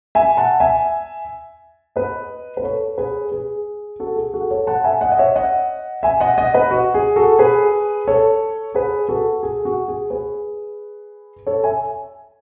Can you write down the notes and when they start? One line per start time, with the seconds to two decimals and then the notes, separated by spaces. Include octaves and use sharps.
0.15 E5 G#5
0.37 F#5 A5
0.60 E5 G#5
1.96 B4 D#5
2.57 B4
2.63 A4 C#5
2.98 G#4 B4
3.32 G#4
4.00 F#4 A4
4.16 G#4
4.34 F#4 A4
4.51 A4 C#5
4.67 F#5 A5
4.84 E5 G#5
5.01 D#5 F#5
5.12 D#5
5.19 C#5 E5
5.36 D#5 F#5
6.03 E5 G#5
6.20 D#5 F#5
6.38 D#5 F#5
6.54 B4 D#5
6.71 F#4
6.94 G#4
7.16 F#4 A4
7.39 G#4 B4
8.07 A4 C#5
8.75 G#4 B4
9.09 F#4 A4
9.43 G#4
9.65 F#4
9.88 G#4
10.10 G#4 B4
11.47 A4 C#5
11.64 E5 G#5